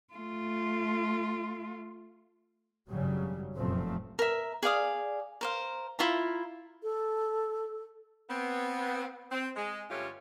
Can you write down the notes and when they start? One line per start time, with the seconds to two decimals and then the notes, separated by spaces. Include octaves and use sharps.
0.14 A3 F4
2.89 G#1 F#2 C#3 F#3 G3
3.56 F1 F#2 A#2 F3 A3 C4
4.19 A#4 E5
4.63 G#4 D5 F5 D#6
5.41 A#4 C5 F5
5.99 E4 F4 E5 A#5
6.83 A4
8.29 B3 C4
9.31 C4
9.56 G#3
9.90 G2 D3 A3 C#4 F4 G4